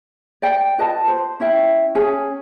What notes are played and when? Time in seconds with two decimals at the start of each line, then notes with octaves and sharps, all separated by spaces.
0.42 D5 G5
0.78 F4 B4 D#5 A5
1.08 C5
1.40 C#4 E4 E5 G5
1.95 C#4 G#4 G#5